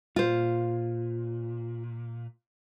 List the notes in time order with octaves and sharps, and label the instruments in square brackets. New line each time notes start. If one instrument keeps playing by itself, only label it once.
[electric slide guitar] A#2 [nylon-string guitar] F4 C5